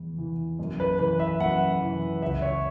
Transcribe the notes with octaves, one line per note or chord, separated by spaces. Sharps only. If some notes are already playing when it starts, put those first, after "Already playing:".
Already playing: E2 E3
E3
F#2
B4
E3 B4
E5
F#2 F#5
E3
C#2 E5
C#5